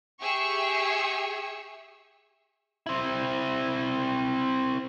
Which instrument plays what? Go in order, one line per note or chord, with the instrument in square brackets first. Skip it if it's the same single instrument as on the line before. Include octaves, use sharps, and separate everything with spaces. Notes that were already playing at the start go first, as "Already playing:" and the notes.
[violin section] G4 G#4 E5 C#6 E6
[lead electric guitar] C4 E4